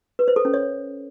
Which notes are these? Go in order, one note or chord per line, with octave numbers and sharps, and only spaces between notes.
B4
C5
A4
C#4
C#5